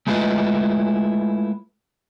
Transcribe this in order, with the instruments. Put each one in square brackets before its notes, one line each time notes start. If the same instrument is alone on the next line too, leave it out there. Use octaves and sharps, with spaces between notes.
[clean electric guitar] G#3 A3 E4 F4 B4 D#5